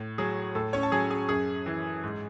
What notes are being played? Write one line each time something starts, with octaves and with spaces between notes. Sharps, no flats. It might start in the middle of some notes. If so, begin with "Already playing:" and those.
Already playing: A2
F#3 G#4
A2 A4
C#4 C#5
A5
F#3 G#4 G#5
G#4 G#5
F#2 G#4 G#5
E3
G#2